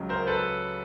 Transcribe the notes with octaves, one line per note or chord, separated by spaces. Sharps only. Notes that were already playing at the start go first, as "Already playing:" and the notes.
Already playing: C#2 C#3 F#3
A#4 C5
A4 B4